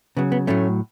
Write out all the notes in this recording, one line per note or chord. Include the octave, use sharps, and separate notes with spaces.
C#3 F#3 B3
B3
A2 F#3 A3 C#4